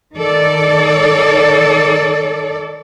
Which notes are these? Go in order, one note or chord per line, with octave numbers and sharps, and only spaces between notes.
D#3 A4 D5